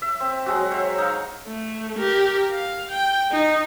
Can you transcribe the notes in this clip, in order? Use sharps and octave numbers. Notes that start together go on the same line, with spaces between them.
E5
C4
F#3 G#3 F#4
C5 C#5 E5
D#4 F5
A3
G4 A#4
F5
G5
D#4